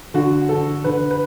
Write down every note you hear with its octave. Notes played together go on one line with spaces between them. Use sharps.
D3 F#4
D3 A4
D3 B4
B4